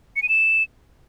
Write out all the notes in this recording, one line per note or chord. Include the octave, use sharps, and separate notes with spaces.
C#7
D#7
E7